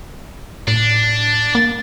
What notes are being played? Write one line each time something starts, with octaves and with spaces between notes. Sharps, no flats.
A2 D4
A#3